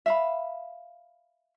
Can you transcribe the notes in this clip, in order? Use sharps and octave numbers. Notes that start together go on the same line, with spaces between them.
E5 F5 B5